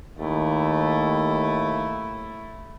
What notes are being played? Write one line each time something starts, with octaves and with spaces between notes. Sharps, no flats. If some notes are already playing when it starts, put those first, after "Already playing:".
D#2 A3 E4